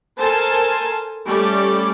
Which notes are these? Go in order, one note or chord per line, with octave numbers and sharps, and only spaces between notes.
A4 A#4 C5 G#5 A5
G3 A3 C#4 G4 A4 D5